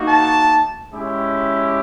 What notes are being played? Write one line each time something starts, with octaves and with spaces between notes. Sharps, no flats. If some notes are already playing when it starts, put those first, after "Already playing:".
Already playing: A#3 D#4 F#4
A5
G#3 C#4 E4 G4